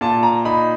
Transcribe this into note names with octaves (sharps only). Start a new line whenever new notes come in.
A#2 A5
A#5
D#4 B5